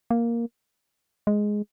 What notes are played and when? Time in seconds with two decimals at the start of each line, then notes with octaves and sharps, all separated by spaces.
0.11 A#3
1.27 G#3